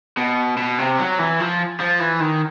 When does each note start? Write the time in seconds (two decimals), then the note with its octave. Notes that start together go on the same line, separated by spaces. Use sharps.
0.17 B2
0.57 B2
0.78 C3
0.98 F#3
1.19 E3
1.40 F3
1.81 F3
2.01 E3
2.21 D#3